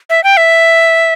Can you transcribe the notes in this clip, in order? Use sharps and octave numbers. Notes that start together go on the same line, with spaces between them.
E5
G5
E5